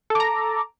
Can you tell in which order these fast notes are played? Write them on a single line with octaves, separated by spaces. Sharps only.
A4 D6 A#5